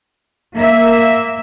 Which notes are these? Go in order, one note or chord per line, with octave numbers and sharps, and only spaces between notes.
A#3 E5